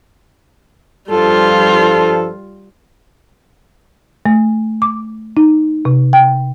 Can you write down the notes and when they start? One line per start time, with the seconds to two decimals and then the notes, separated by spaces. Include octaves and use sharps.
1.11 G2 F3 G3 F4 A4
4.26 A3
4.82 D6
5.37 D#4
5.85 C3
6.13 G5